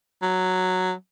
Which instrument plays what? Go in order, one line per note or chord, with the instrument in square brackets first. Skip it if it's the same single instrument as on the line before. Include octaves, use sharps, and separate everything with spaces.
[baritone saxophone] F#3